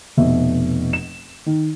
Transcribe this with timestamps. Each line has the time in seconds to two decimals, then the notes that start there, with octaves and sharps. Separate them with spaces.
0.17 F1 B2 E5
0.93 E7
1.46 D#3